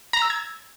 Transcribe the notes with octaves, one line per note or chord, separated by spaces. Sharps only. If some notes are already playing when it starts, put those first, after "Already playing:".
A#5
E6
G#6